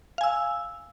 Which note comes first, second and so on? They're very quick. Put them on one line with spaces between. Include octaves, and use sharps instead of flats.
F5 G#5 E6